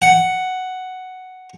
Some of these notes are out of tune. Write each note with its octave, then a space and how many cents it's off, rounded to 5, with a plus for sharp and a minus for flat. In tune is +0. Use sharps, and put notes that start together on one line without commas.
F#5 +5